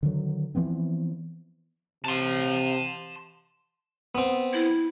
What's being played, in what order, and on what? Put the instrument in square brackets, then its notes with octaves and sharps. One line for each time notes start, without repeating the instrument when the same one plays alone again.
[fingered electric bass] D3 D#3 F#3
E3 F3 B3 C4
[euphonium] C3 [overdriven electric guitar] A5 C6
[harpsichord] B3 C4
[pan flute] E4